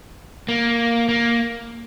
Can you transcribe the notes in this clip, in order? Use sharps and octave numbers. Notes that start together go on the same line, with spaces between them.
A#3
A#3